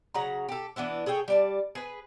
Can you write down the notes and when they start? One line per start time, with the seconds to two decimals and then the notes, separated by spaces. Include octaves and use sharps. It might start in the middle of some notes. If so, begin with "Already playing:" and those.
0.14 C#3 F#3 F#5 A#5
0.49 G4 A4
0.76 E3 B3 D4 E4
1.06 G#4 A4 C#5 G5
1.28 G3 D5 A5
1.75 G#4 B4